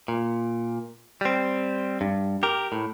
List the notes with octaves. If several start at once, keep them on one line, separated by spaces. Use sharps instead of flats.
A#2
G3 C4
G2
G4 A#4
A2